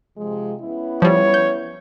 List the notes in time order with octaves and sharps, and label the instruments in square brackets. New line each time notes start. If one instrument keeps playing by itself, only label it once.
[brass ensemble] C3 F3 G#3
B3 C#4 E4
[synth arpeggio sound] F3 G3 [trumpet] C#5
[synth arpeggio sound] G6